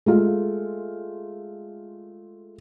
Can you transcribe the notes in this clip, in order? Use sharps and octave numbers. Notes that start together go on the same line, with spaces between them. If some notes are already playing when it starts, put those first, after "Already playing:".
G#3 A3 F4